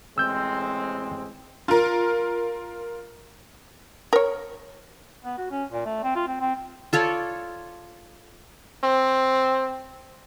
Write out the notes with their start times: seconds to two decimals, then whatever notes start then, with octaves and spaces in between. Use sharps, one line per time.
0.18 A1 G#3 C4 E6 G6
1.68 F4 A#4
4.13 A#4 C#5
5.25 B3
5.38 F#4
5.51 C#4
5.72 A#2
5.86 A3
6.04 C4
6.15 F4
6.27 C4
6.41 C4
6.93 F4 A4 C#5 D5
8.83 C4